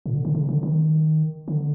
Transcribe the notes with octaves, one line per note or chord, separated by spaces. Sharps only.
A#2
D3
D3
C#3
D3
D#3
D3